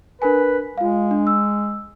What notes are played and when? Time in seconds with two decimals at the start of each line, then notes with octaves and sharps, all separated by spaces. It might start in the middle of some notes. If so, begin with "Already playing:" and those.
0.22 D4 A#4 B4 G#5
0.78 G#3 F4 F5
1.11 D4
1.27 E6